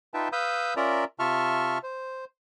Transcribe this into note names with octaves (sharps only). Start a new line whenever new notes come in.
D#4 F4 B4 E5 G5 A5
B4 F5 B5 D#6 E6 G6
C#4 F4 A#4 D5 E5 A#5
C3 F4 E5 A5 C#6 F6
C5